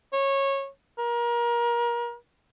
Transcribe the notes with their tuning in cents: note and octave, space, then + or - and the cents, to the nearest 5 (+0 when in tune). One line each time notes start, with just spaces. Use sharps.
C#5 -15
A#4 +30